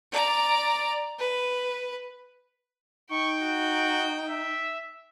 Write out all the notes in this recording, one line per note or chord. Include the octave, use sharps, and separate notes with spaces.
D5 A#5
B4
D#4 G5 C#6
F#4
E5